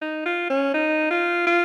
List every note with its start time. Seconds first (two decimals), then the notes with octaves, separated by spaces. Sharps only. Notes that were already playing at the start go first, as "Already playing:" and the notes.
0.02 D#4
0.26 F4
0.50 C#4
0.74 D#4
1.11 F4
1.47 F4